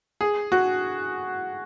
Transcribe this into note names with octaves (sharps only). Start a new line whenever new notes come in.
G#4
F#4